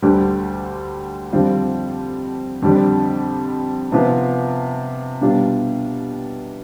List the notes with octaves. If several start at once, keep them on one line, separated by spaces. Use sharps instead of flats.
D2 D3 G3
F2 D3 G3 C4 F4
F2 D3 G3 D4
C3 F3 B3 F4
B2 G3 D4 F4